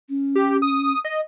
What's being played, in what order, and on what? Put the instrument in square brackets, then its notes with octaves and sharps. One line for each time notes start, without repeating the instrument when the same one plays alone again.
[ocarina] C#4
[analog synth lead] G4
D#6
D#5